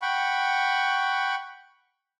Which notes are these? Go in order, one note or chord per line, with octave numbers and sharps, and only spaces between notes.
F#5 G5 B5 C#6